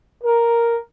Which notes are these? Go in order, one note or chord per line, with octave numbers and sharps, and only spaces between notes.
A#4